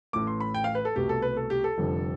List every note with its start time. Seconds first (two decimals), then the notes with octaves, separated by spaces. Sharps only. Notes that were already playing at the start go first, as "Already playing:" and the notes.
0.13 A1 A2 E3 A3 D6
0.27 C6
0.40 B5
0.54 G5
0.64 F5
0.75 B4
0.85 A4
0.95 C2 B2 A3 G4
1.09 A4
1.22 B4
1.37 A4
1.50 G4
1.64 A4
1.78 F1 F2 D3 G3